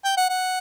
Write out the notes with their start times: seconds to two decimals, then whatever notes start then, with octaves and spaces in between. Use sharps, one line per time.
0.05 G5
0.17 F#5
0.29 F#5